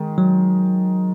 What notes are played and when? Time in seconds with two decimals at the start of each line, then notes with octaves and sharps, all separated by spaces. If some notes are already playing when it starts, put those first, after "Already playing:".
Already playing: D#3 G#3
0.18 F#3